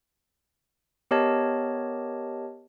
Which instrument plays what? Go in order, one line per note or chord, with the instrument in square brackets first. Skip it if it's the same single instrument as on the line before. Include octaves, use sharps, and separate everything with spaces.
[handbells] B3 G4 A#4 C#5 D#5 A5